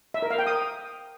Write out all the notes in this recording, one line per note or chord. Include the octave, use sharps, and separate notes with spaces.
E5
A#4
F5
G5
D#6